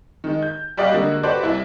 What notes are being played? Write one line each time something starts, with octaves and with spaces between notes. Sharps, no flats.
D#3 G#3
G6
G3 F#4 G4 D5 D#5 F5
D3 G#3 A#3 F#4
F#4 G4 A4 B4 C5 D5
C2 E4